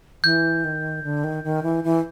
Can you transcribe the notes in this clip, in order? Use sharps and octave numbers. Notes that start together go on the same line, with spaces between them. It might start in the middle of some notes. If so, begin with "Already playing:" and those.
E3 G6
D#3
D3
D#3
D#3
E3
E3